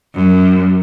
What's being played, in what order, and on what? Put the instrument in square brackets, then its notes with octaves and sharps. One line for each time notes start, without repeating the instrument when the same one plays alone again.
[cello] F#2